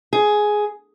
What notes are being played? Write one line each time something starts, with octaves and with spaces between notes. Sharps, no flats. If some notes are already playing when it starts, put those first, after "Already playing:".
G#4